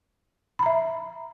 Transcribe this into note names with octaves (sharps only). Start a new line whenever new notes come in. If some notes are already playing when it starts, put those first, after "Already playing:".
E5 A#5 B5